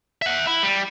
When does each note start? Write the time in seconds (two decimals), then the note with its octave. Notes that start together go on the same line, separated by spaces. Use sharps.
0.22 E5 F#5
0.47 E4
0.63 G3